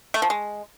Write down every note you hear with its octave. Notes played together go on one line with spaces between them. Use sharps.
A3
F3
G#3